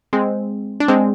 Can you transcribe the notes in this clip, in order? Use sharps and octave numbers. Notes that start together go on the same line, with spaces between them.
G#3 C4
D4
G#3 C4